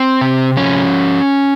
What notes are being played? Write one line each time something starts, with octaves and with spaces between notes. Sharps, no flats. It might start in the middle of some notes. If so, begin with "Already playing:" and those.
Already playing: C4
C3
F3 C#4